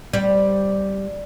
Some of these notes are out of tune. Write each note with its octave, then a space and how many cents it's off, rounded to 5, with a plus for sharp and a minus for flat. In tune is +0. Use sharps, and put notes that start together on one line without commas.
G3 -5 C4 +0